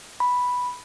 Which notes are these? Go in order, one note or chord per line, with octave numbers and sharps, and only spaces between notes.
B5